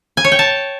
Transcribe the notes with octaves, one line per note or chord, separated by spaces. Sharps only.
G#5
C#5
G5
A5